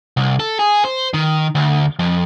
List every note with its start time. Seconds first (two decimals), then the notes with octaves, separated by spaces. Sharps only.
0.17 C2
0.40 A4
0.59 G#4
0.85 C5
1.14 D#3
1.55 D2
1.99 F2